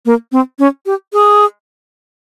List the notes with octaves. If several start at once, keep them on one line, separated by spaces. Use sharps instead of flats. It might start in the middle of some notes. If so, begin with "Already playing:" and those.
A#3
C4
C#4
G4
G#4